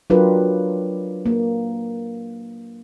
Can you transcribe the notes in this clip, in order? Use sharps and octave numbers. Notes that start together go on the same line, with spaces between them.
F#3 D4 F4 G4 A#4 B4
A#3